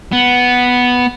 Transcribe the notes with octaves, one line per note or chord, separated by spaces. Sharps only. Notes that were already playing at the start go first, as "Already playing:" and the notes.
B3